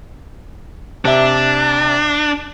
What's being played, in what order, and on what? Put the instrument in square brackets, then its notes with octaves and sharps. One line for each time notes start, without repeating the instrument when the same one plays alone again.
[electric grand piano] C3 E5 [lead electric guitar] D4